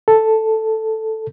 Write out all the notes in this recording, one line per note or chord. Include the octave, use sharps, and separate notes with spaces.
A4